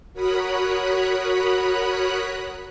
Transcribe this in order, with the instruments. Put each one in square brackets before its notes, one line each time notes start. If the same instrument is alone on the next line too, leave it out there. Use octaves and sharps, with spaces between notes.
[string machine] F#4 A#4 C#5 B5 D#6 F#6